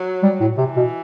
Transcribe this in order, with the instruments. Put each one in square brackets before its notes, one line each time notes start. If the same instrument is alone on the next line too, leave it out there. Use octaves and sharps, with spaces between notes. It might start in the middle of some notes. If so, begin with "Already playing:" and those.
Already playing: [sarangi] F#3
[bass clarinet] G3
A2
[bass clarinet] C3 [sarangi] E3
[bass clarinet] B2